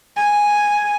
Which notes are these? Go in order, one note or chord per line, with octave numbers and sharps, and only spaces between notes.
G#5